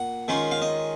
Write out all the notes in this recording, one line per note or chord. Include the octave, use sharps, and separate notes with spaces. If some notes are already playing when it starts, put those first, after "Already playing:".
Already playing: A#2 F#5
D#3 G#3 C#4 F4
F5
D#5